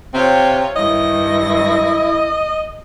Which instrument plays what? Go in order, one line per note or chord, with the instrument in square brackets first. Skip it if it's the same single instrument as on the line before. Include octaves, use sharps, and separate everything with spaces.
[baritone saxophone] C3 [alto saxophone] C4 [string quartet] F4 C#5
[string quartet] G2 D#3 A#6 [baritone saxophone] E4 [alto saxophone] D#5